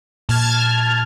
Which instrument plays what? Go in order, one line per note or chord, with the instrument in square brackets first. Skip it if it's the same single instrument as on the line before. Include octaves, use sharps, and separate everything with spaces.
[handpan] A#2 [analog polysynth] A5 F6 G#6